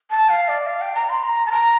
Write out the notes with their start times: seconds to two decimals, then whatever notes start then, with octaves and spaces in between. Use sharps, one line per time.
0.10 A5
0.29 F5
0.48 D5
0.67 F5
0.81 G5
0.95 A#5
1.09 C6
1.24 A#5
1.46 A5
1.51 A#5